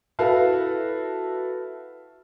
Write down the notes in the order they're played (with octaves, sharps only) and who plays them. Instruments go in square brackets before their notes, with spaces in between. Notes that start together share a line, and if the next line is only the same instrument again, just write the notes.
[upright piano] E4 F#4 A4 B4 F5